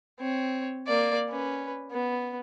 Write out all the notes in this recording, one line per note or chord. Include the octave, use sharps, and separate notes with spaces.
C4 C#5
A#3 D5
C#4 B4
B3